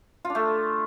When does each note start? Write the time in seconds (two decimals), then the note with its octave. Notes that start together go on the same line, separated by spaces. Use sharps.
0.25 F4
0.30 D4
0.35 A3